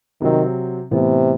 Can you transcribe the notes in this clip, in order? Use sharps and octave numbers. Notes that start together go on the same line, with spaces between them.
C3 D#3 F#3 C4
A2 C3 E3 B3